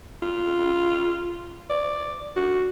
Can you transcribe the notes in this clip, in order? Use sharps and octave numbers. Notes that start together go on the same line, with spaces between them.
F4
D5
F#4